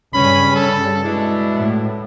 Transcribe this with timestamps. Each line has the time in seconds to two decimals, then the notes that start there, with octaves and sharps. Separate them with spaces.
0.14 G2 C#3 G3 C#4 B5
0.56 A4
1.04 B2 G#3 D4 E4
1.56 A2